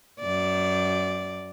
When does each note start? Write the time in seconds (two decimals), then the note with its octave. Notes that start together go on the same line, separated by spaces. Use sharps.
0.20 F#2 D5